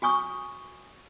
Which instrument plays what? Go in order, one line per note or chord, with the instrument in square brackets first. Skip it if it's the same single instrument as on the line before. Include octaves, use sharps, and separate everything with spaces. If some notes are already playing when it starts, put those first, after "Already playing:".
[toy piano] F#4 G#5 C#6 D#6